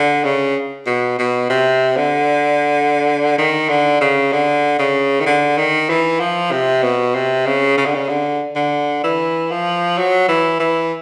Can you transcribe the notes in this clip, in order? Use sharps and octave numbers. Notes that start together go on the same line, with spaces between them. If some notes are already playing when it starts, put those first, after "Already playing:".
Already playing: D3
C#3
B2
B2
C3
D3
D#3
D3
C#3
D3
C#3
D#3
D3
D#3
E3
F3
C3
B2
C3
C#3
C#3
D3
C#3
D3
D3
E3
F3
F#3
E3
E3